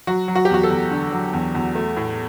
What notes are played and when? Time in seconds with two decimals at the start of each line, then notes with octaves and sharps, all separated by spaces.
0.07 F#3 F#4
0.28 F#3
0.35 F#4
0.45 G4
0.50 E2 F#4
0.63 A4
0.70 E2
0.91 D3
1.12 F#3
1.33 E2
1.55 E2
1.75 A3
1.97 A2